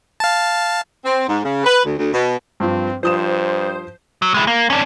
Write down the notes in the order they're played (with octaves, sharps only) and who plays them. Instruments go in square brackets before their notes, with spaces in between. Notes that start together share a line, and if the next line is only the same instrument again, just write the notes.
[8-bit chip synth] F5 A5
[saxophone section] C4
G#2
C#3
B4
D2
D2
B2
[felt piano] G2 F3 [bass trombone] C4
[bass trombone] G2 [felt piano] F3 D#6 E7 [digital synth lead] C5
[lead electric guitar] F#3
G#3 E4
A#3
C#4 D4